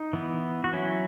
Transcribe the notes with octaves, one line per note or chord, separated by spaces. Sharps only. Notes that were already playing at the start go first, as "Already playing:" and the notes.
Already playing: D#4
E3 B3
F#4
F#3 C#4 E4